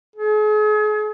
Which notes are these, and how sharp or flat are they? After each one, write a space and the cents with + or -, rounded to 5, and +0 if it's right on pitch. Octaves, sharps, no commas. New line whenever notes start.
G#4 +40